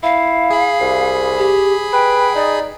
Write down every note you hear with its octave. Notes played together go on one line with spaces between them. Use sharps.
E4 F5
G#4 B5
C2
G4
B4 G5
D#4 D5